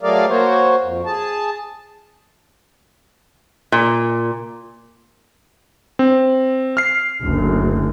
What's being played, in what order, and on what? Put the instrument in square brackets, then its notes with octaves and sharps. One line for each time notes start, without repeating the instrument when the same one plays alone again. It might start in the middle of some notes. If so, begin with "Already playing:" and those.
[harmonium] F#3 A3 G#4 A#4 D5 F5
A#3 F#4 C5 C#5
F2
G#4 A5
[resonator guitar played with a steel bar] A#2
[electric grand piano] C4
F6 C7
[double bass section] F#1 D2